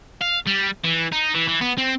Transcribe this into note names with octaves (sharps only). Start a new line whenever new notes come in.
F5
G3
E3
D#4
E3
E3
B3
C4